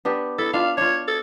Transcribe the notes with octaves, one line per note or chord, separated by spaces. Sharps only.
B3 D4 G4
E4 A4
D4 F4 F5
D4 F4 C#5
A4